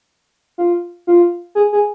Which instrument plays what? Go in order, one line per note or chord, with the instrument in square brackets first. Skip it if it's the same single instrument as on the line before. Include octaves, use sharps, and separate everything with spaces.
[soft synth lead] F4
F4
G#4
G#4